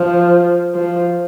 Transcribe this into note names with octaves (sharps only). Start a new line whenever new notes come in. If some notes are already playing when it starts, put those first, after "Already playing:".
Already playing: F3
F3